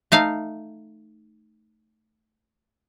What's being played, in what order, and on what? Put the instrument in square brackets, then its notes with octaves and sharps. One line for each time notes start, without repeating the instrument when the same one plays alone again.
[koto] A3 D#4 F5